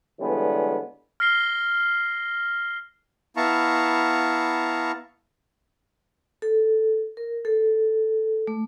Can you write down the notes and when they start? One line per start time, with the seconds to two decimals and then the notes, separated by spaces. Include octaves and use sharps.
0.20 D3 E3 G3 G#3 B3 C#4
1.20 F6 A#6 C7 G7
3.37 B3 E4 F5 A5 A#5 C#6
6.42 A4
7.17 A#4
7.45 A4
8.47 A3